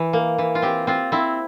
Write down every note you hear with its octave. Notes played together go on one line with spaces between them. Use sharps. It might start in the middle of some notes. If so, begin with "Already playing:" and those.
Already playing: E3
A#3
E3
F4
C4 G4
C4 F4
C4 E4